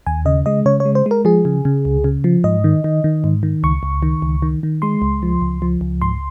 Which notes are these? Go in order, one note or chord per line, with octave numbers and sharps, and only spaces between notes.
D#2 G#5
C#3 D#5
G#3 D#5
C#3 C#5
C#5
G#3
C5
G#3 A#4
F3 G#4
C#3
C#3
C#2
C#3
F3
G#2 D#5
D#3
D#3
D#3
G#2
D#3
C#2 C#6
C#2
D#3
C#2
D#3
D#3
G#3 C6
C#2
F3
C#2
F3
C#2
G#2 C6